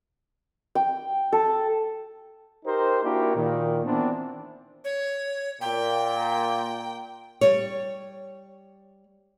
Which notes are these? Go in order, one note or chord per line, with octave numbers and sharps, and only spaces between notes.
G5
A4
D#4 G4 A#4 C5
A#3 D4 E4 F#4 G4 A#4
A#2 D#3
E3 B3 C4 D4
C#5
A#2 G5
G3 C#5